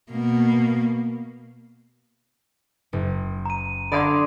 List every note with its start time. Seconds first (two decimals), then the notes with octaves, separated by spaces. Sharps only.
0.12 B2 A#3
2.93 F#1
3.46 A#5 D#7
3.92 D3 D5 F5 B5 C6 D#6 G#6